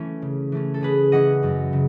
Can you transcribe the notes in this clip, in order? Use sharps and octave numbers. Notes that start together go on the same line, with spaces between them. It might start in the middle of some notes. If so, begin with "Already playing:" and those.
Already playing: E3 A3 C#4 E4
C#3
E3 A3 C#4
A4
C#3 G#4 B4
E3 A3 C#4 D#5 F#5
F#2
C#3